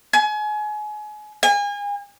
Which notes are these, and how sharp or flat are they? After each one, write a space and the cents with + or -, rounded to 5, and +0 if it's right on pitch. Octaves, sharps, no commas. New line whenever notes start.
G#5 +30
G#5 -35